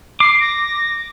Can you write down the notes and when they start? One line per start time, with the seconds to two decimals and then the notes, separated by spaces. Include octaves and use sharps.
0.20 D6 C7
0.40 A#6